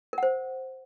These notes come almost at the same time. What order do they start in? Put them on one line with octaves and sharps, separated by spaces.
A#4 F#5 C5